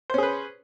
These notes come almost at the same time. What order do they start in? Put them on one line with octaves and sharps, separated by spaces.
C5 C#4 G#4 B4